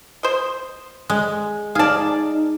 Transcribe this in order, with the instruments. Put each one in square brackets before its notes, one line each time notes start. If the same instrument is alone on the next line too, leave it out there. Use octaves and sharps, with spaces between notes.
[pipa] C5 D#5
[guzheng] G#3
[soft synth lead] D#4 [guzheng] G#4 D5 [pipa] F5 A5